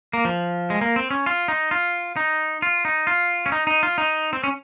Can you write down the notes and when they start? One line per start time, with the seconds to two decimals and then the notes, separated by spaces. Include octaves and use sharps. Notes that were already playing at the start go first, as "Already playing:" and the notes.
0.13 A#3
0.25 F3
0.70 G#3
0.81 A#3
0.96 C4
1.11 C#4
1.26 F4
1.48 D#4
1.71 F4
2.16 D#4
2.62 F4
2.85 D#4
3.07 F4
3.46 C#4
3.52 D#4
3.67 D#4
3.83 F4
3.98 D#4
4.33 C4
4.44 C#4